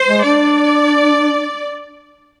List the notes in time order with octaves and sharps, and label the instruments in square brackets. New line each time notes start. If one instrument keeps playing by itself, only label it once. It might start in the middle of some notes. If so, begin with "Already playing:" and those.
Already playing: [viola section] C5
[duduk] G#3
[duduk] D4 [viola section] D5